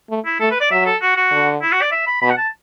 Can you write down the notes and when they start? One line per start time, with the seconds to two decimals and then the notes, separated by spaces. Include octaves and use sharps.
0.10 A3
0.26 E4
0.40 A3 A4
0.51 B4
0.61 D5
0.71 F#3 E5
0.86 A4
1.02 F#4
1.16 F#4
1.32 D3
1.62 E4
1.72 F#4
1.82 D5
1.92 E5
2.07 B5
2.22 B2 B5
2.30 F#5
2.37 A5